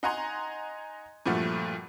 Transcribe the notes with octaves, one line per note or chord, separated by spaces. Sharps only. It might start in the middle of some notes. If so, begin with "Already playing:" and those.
D#4 F#5 G#5 A#5 C6
G2 A#2 F3 A3 F#4